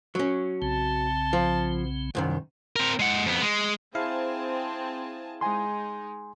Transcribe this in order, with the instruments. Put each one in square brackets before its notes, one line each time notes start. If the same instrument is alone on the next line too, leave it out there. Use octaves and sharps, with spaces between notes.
[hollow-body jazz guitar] F#3 C#4
[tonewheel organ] B1 C#3 C4 [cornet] A5
[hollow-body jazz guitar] F3
C2 F#2 D#3
[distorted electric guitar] C4 A#4
G#3 F#5
F2 B3
G#3
[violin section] C4 [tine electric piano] E4 F5 [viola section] G#4 G#5 A5
[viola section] G#3 D#4 [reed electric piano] G#5 C6